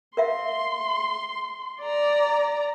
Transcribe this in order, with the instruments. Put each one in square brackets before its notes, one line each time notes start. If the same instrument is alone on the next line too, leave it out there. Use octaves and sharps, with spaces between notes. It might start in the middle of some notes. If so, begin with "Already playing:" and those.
[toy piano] A#4 E5 F5 [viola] C6
[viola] D5 A#5